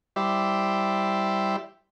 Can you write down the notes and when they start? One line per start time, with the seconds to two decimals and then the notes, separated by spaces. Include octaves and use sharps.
0.16 G3 E4 G4 C5 D5 E5